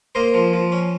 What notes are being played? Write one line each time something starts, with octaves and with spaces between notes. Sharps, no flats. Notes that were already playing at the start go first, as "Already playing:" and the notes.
A#3 C5 D#5
F3
F3
C#4